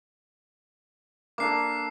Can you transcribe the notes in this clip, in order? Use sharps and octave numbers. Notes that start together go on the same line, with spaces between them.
A#3 D4 A4 D6 C7